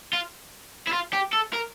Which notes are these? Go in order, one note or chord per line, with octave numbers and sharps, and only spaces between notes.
F4
E4
F4
G4
A4
A#4